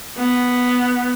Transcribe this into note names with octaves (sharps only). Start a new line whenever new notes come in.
B3